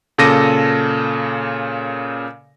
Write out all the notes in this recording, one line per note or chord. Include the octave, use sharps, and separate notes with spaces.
A#2 C#3 A4 D6 A#6 D#7